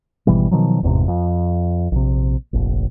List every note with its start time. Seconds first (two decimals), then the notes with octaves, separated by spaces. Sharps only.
0.27 G#1 B2 E3 G3
0.51 B2 D#3 F3 F#3
0.83 G1 E2 G#2 C3
1.08 F2
1.92 A#1 C3
2.53 F1 A#1